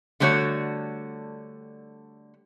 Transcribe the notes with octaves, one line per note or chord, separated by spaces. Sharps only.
D3 G3 A3 F#4 C#5